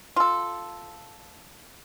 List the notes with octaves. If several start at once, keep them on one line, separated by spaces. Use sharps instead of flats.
F4 A4